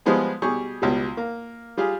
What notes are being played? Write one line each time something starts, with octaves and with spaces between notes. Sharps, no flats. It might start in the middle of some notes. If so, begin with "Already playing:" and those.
F3 G3 G#3 B3 F4 G#4
B2 G3 G4 G#4 C#6
C#2 B2 G3
A#3
G3 F4 G4 G#4